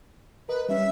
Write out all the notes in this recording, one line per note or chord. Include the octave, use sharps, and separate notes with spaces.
A#4 B4 D#5
G3 C#4 E5